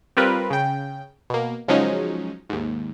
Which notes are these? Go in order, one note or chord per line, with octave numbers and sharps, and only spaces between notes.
G3 C4 F4 A#4 B4
C#3 G5
B2 A#3
C#3 F3 F#3 G#3 C#4 D#4
D#2 G#2